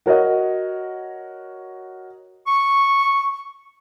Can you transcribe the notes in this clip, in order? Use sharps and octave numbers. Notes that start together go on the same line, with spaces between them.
F#4 A#4 C#5 D#5 F#5
C#6